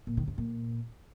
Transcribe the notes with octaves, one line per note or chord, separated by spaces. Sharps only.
A#2
D#3
G2
A#2